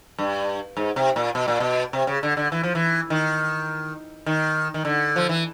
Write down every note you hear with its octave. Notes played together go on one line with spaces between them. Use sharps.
G2
G#2
C3
A#2
B2
A#2
B2
C3
C#3
D3
D3
E3
F3
E3
D#3
D#3
D#3
D3
F3
E3